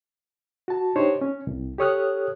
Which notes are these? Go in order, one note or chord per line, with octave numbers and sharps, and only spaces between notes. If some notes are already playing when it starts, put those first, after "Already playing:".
F#4 A5
D4 D#4 G4 C5 C#5
C#4
C2
G4 A4 C#5 D#6 F6 F#6